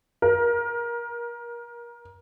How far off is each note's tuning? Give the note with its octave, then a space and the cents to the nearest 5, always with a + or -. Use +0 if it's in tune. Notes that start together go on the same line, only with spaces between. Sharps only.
A#4 +30